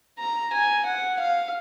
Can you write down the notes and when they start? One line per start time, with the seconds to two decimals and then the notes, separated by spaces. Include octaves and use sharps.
0.19 A#5
0.53 G#5
0.86 F#5
1.20 F5